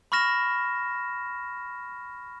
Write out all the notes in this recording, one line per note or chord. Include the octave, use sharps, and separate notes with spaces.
B5 C#6 F6 A#6 E7